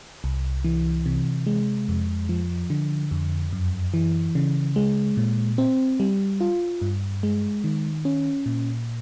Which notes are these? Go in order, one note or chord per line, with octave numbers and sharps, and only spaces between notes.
C2
E3
C3
G#3
F2
F3
D3
F2
F#2
E3
C#3
G#3
A#2
C4
G3
F4
G2
G#3
D#3
C#4
A#2